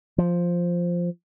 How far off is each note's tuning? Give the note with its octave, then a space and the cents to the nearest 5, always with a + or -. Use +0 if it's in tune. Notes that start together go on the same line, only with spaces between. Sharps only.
F3 +0